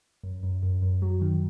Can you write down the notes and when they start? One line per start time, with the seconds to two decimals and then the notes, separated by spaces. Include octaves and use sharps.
0.23 F#2
0.43 F#2
0.63 F#2
0.82 F#2
1.02 F#3
1.22 D#3